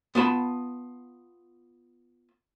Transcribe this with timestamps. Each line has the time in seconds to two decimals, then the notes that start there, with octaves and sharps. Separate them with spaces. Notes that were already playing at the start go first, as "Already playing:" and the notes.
0.15 B3 F4 A5 B5